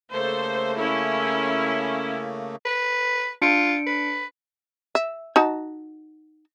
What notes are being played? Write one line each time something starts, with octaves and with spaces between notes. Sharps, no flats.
C#3 A3 A#3 A4 C5
C#4 E4
B4
D4 F4 C#7 D7
B4
E5
D#4 F#4 A5